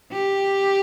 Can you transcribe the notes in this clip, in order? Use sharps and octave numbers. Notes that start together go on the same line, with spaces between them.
G4